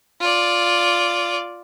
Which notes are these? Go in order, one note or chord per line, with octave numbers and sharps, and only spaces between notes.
F4 D5